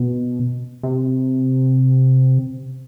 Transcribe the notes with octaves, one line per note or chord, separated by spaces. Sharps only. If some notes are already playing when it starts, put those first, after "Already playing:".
Already playing: B2
C3